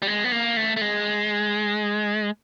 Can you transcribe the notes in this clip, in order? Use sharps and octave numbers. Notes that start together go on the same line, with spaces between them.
G3
G#3
B3
A#3
A3
A3
G#3